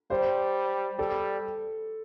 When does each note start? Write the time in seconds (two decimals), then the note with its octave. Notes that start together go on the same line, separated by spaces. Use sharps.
0.10 G3 C5
0.99 G3 A4